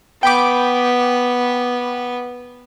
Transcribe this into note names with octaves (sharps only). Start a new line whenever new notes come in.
B3 G5 B5 D6